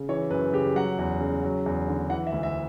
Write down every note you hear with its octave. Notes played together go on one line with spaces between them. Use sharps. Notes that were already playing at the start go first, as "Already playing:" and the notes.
Already playing: C#3
E3 C#5
F#2 B4
C#3 G4
F#3 F#5
E2
C#3
F#3
E2
D3
E3 F#5
E5
D2
E5